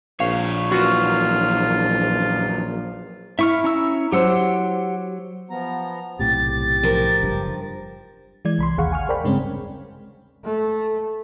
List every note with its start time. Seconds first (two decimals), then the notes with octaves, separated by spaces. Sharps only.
0.20 A#1 A#2 C#5 F5
0.72 F#2 E3 F4 F#4
3.39 E4 E5 C#6 F6
3.64 C#4 A#5 E6
4.12 F#3 G4 C5 F#5 E6
5.50 F3 B3 A#5
6.19 B1 A2 C3 G4 A6
6.83 F3 A#4
7.22 F#1 G2
8.45 E3 G#3 D5 G#6
8.58 C2 B5 C6
8.78 A1 D#2 G#4 F5 F#5 C#6
8.92 G#5 C#6 F6
9.09 A#4 C5 D5 G5 B5
9.24 G2 C#3 G#3 C4 C#4
10.45 A3